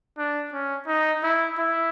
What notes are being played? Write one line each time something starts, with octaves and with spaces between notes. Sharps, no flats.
D4
C#4
D#4
E4
E4